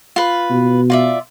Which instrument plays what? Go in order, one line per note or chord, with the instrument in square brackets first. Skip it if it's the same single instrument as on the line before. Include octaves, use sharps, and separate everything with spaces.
[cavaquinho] F4 B4
[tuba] B2
[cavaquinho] F4 D5 E5